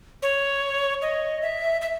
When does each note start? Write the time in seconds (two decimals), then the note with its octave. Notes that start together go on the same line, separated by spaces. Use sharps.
0.22 C#5
1.02 D#5
1.42 E5
1.81 E5